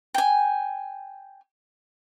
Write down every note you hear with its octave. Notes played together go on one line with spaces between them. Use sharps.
G5 G#5